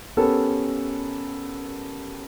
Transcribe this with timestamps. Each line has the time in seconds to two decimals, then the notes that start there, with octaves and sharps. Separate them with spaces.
0.17 B3 C#4 G4 A4 A#4